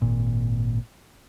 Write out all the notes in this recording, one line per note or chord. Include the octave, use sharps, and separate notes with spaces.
G#1 A#2